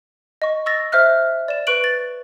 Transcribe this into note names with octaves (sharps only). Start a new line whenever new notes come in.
D#5 C#6
C#6 E6 A6 A#6
C5 E5 F6 F#6
D5 E7
B4 C#6 F#6 D7 F#7
A6